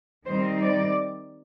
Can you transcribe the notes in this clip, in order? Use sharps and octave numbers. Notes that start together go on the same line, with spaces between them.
D#3 G3 C4 D#4 C5
D5